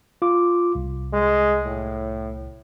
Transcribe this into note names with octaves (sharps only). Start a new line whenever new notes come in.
F4 D6
C2
G#3
A2